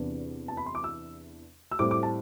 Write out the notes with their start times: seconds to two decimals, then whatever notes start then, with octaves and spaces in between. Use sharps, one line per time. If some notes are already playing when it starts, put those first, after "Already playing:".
Already playing: E2 C3 E3 B3 D4
0.48 A5
0.57 B5
0.66 C6
0.75 D6
0.84 E6
1.71 E6
1.79 A2 G3 C4 D6
1.91 D6
2.03 A5